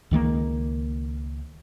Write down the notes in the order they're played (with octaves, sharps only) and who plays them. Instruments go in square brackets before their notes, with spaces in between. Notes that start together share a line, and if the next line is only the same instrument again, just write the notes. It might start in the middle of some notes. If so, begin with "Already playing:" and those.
[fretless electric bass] C#2 D#3 G3 A#3